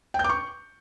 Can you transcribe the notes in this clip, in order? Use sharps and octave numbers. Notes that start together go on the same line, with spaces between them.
G5
G6
D6
C#6